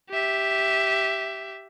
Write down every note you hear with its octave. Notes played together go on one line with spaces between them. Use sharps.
G4 E5